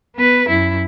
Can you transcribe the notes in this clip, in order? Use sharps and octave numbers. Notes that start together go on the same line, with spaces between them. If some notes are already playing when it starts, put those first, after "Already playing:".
B3 B4
F#2 E4